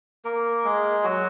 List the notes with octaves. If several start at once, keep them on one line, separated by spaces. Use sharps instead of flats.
A#3 A#4
G#3 G#4
F#3 F#4